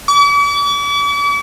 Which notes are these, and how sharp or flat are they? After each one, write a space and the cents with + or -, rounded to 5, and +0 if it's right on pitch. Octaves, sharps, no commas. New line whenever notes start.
D6 -45